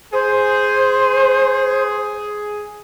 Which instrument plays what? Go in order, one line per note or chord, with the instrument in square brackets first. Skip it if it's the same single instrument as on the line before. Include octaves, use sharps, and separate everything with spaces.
[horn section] G#4 [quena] C5